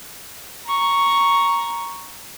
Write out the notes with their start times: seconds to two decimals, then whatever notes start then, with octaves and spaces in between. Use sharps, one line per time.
0.66 A#5 C#6